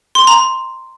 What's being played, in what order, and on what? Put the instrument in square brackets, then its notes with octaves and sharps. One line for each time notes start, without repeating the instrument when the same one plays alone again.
[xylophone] C6
A#5